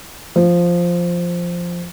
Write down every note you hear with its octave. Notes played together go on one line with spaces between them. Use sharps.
F3